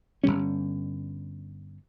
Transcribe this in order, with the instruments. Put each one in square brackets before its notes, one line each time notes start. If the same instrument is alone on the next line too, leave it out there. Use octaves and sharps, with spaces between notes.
[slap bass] G1 F#2 G3 C#4